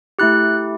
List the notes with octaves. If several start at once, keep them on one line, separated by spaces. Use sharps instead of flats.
A3 E4 G4 F#6